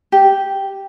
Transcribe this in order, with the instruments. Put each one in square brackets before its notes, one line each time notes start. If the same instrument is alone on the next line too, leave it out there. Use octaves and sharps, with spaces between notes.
[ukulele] G4